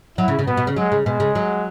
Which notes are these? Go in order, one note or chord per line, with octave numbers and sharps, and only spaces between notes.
F#3 E4
C#3
C#3
B2 B3
B2
C#3
F#3 G#3
C#3
B2 G#3
C#3
F#3